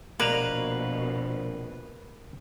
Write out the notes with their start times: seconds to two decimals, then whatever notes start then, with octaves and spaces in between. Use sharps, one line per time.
0.20 A#1 B2 A#3 B4 D5 A#5